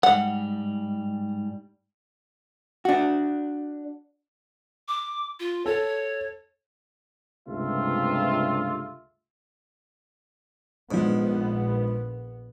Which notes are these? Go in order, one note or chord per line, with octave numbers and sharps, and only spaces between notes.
G#2 G3 F#5
D4 F#4
D6
F4
A4 C#5
C#2 G2 C3 A3 F4 E5
A#1 G#2 F3 B3 D4